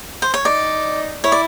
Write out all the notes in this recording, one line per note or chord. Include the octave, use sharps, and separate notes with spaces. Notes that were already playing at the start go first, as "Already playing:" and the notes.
C5
C#5
D#4 D5
E4 C#5
D5